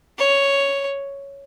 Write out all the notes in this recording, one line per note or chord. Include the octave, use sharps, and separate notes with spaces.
C#5